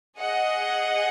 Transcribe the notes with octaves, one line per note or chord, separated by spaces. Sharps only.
G#4 D#5 F#5